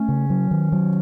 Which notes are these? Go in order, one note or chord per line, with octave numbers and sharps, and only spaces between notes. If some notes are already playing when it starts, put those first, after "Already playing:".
Already playing: A3 C#4
C#3
F#3
D#3
F#3